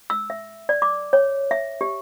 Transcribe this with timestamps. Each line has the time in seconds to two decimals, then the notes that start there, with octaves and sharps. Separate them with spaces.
0.10 E6
0.30 E5
0.69 D5
0.82 D6
1.13 C#5
1.51 E5
1.81 G4